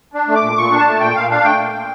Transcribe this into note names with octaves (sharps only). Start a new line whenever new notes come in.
D4
A3
D6
A#2
A#2 C#6
D4
A5
A3
A#2 G5
A#2 F5
D4 F5
A3 G5
A#2
A#2